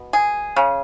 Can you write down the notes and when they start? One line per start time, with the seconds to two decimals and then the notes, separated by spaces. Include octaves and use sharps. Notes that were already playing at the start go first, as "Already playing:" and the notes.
Already playing: B2
0.13 G#4
0.56 C#3